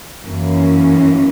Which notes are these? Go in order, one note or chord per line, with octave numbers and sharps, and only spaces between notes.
F#2 E3 A#3 C#4